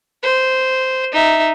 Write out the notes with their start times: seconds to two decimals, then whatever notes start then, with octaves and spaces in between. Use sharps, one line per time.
0.23 C5
1.12 D#4 E5